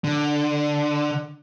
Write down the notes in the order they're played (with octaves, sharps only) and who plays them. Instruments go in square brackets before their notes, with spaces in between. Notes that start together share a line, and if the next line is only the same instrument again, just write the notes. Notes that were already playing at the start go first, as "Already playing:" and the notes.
[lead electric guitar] D3